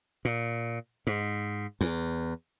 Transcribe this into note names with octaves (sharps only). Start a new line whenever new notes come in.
A#2
G#2
E2